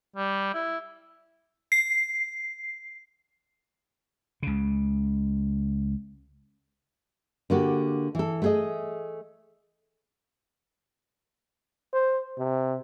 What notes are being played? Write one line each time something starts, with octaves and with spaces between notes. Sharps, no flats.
G3
E4
C7
C#2 C#3
D3 A#3 F#4 G4
E3 A4
A3 G#4 D#5
C5
C3